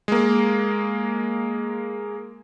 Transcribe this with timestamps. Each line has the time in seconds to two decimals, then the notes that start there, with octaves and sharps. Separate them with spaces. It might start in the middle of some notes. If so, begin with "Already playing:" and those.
0.08 G#3 A#3